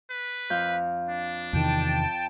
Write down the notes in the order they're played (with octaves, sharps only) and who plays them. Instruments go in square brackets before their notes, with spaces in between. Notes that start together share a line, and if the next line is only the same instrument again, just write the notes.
[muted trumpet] B4
[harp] F2 F5 G6
[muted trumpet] D4
[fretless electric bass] E2 C3 D#3 [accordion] G5 A5